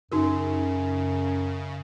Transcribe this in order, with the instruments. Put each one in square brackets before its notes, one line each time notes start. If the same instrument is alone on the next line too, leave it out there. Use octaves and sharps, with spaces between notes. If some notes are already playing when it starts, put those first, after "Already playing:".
[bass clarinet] F#2 [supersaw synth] C#3 [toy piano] D#4 F#4 A#4